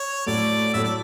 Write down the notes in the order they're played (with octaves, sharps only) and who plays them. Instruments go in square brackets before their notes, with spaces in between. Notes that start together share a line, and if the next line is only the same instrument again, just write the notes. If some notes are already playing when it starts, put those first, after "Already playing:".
Already playing: [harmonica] C#5
[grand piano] A2 F#3 A3 [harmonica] D5
[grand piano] A2 F#3 A3 [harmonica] E5
[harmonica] D5